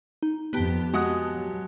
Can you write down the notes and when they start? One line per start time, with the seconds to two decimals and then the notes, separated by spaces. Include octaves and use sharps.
0.23 D#4
0.53 F2 B3 G4 A5
0.93 G#3 F#4 F#5 D#6
1.29 F#3